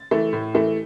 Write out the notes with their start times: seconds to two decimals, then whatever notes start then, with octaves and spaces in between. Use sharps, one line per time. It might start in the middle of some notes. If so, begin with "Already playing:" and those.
Already playing: A6
0.11 E3 A3
0.33 A2
0.54 E3 A3